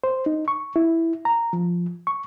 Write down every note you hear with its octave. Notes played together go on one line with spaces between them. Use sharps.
C5
D#4
C#6
E4
A#5
F3
C#6